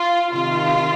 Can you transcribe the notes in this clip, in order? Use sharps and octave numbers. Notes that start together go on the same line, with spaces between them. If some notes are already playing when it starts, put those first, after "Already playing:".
Already playing: F4
C3 D#3 F4